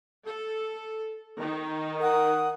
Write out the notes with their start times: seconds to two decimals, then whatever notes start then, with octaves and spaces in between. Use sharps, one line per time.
0.25 A4
1.40 D#3 D#4
2.01 A#4 F#5 D#6